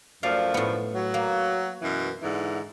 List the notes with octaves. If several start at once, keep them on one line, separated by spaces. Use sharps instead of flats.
F#2 F3 A3 D5 F5
A2 B3
F#3
A#3
F#2 B2 E3
G#2 D3 E3